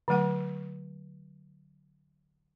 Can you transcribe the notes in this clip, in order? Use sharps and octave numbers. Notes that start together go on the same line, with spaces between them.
D3 F#3 A3 F#5